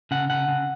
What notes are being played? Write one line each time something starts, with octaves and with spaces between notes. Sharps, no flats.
C#3 F#5
C#3 F#5
C#3